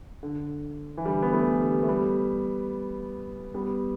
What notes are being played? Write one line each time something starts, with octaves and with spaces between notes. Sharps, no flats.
D3
E3
D3 G3
B3
E3 A3
D3 G3
A3
G3 B3
G3 B3